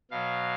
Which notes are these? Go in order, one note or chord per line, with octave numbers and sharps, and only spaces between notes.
B2 F#3 F5